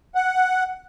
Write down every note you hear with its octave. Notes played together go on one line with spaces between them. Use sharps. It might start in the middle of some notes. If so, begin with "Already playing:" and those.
F#5